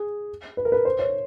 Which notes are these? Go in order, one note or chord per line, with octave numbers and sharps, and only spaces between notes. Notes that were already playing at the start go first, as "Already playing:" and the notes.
Already playing: G#4
B4
A#4
B4
C5
C#5